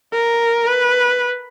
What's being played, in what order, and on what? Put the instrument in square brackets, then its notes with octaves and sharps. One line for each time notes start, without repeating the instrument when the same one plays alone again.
[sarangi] A#4
B4